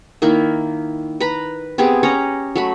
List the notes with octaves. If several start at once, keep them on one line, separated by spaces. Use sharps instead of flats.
D#3 A#3 E4
B4 A#5 B5
B3 C4 G4 G#4
C#4 C#5 A#5
F#3 A3 B5